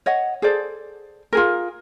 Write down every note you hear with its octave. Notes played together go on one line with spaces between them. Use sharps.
C#5 D#5 F#5
G#4 A4 C5 D5
F4 G#4 A#4